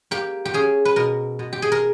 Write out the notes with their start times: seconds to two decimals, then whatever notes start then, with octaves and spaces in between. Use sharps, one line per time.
0.11 A#3 G4
0.45 G4
0.54 C#4 G#4
0.85 B4
0.96 B2 A#4
1.39 B2
1.53 G4
1.62 G#4
1.72 A#4